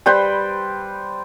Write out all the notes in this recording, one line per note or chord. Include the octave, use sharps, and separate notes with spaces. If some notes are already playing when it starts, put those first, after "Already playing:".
G3 B4 C5 G5